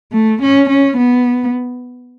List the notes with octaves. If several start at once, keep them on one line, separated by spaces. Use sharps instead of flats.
A3
C#4
C#4
B3